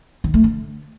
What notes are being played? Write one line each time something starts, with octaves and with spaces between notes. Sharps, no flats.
D#3
A3
D3